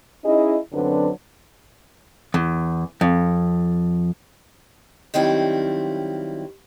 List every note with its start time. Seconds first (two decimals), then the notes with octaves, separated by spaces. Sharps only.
0.25 C#4 D#4 E4 G#4 D#5
0.73 F#2 D3 F#3 C4 D4 B4
2.34 E2
3.01 F2
5.14 D#3 F#3 G3 C4 E4 F4